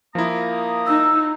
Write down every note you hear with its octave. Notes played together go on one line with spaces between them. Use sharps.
F3 A#3 E4 A#5 D#6
D#4 E6